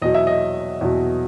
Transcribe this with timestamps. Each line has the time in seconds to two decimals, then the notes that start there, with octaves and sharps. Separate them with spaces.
0.02 E2 B2 F#3 D#5
0.14 E5
0.27 D#5
0.81 E2 B2 F#3